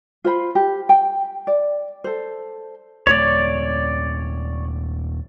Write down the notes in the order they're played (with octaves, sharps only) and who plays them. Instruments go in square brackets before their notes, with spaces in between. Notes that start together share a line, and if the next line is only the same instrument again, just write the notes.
[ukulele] F4 C5 B5
G4
G5
D5
A4 C5
[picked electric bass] D#1 A3 [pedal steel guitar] C#5 D5